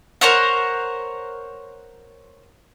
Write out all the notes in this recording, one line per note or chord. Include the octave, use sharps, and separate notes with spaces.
A#4 C5 C#5 F#5